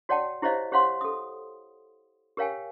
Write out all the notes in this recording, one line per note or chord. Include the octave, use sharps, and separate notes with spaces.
F#4 C#5 D5 F#5 G5 A5
E4 G4 C5 C#5 D#5 F5
G4 C5 C#5 F5 F#5 C6
A4 D#6
G4 A#4 C#5 F5 G5 G#5